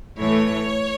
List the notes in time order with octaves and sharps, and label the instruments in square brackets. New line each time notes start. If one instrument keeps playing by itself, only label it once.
[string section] A2 E3 A3 C#5